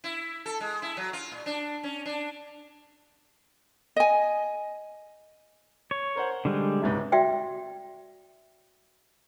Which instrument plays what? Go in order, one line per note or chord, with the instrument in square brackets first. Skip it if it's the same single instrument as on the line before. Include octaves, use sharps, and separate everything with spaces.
[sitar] E4
A4
G#3
E4
F#3
F4
A#2
D4
C#4
D4
[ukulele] D#5 G#5
[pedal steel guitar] C#5
[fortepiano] A#4 C5 F#5
[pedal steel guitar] D3 G3 G#3
[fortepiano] C#2 G#2 C3
[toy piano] F#4 D5 E5 G5